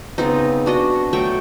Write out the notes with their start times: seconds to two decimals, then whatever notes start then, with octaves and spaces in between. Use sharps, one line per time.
0.18 C#3 B3 C4 D#4
0.66 D4 F#4 D#5
1.13 F#3 A3 G5 C#6